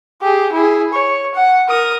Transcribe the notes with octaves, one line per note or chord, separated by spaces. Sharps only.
G4 G#4
E4 G#4
C#5
F#5
A#4 D#6